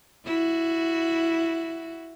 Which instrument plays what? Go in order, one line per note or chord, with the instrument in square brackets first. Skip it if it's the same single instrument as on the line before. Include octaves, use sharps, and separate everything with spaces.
[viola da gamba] E4 F#4